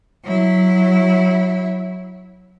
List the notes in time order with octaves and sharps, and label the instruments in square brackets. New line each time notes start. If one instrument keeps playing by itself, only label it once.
[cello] F#3 E4